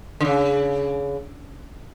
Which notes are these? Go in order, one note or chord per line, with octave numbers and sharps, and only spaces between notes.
D3
C#3